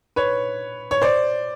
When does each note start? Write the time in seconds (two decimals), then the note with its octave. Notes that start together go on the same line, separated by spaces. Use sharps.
0.16 B4 C#5
0.91 C#5
1.02 C5 D5